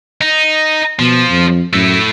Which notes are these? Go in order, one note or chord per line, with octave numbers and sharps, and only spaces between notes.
D#4
B2 F3
F2
F#2 A3 E4